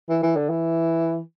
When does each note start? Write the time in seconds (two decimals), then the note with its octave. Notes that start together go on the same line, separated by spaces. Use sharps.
0.10 E3
0.23 E3
0.36 D3
0.50 E3